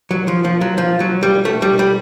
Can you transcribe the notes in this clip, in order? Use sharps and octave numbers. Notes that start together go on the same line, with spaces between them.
F#3
F3
F3
F#3
F3
F#3
G3
A3
G3
G3